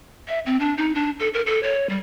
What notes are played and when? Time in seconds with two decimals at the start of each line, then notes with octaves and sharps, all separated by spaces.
0.28 E5
0.46 C4
0.60 D4
0.77 D#4
0.95 D4
1.20 A4
1.34 A#4
1.46 A4
1.63 C#5
1.89 G3